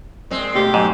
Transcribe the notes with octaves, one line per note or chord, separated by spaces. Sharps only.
A#2 G#3 C4
B2 A3 G4 C6
G#2 F#3